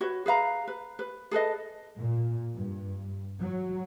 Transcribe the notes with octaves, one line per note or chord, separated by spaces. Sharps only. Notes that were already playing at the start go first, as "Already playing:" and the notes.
F#4 B4 C#5
G#4 B4 F5 A#5
B4
B4
G#4 A4 B4 D#5
A#2
G2
F#3